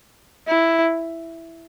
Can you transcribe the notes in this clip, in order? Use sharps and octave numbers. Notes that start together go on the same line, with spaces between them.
E4